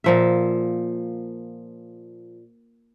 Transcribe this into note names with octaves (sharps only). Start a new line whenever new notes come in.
A#2 F3 E5